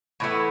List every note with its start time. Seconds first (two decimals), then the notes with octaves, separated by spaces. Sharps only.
0.20 A2 E3 B3 E4